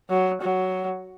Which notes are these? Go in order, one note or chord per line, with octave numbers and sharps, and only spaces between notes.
F#3
F#3